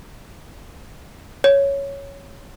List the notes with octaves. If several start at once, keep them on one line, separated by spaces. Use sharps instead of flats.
C#5